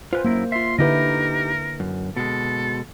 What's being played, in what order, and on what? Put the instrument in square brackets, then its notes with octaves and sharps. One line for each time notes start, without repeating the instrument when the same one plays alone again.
[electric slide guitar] F4 B4 G#5 [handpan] C5
[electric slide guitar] F#2 E4 A#4 [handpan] A#3
[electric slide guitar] F4 E5 [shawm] C6
[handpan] D3 E4 B4 [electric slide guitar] D#4 G4 D#5 [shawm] A#4
[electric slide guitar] F#2
[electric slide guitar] B2 G#3 [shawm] A4